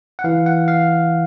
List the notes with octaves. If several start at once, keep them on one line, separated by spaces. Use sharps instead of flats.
F#5
E3 F5
F#5
F5